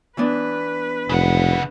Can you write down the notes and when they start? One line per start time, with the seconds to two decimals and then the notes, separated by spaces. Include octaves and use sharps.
0.17 E3 B3 D4 B4
1.09 F1 C#3 F#5